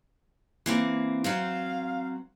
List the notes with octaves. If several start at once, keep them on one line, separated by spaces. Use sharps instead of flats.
E3 A#3 C4
F#3 C4 C5 F5